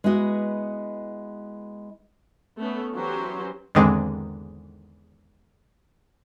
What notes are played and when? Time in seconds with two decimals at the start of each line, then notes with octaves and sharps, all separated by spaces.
0.04 G#3 B3 E4 F#4 D#5
2.57 A3 B3 C#4
2.95 E3 F#3 C#4 G4 C5
3.75 E2 G#2 D3 D#3 G#3 C4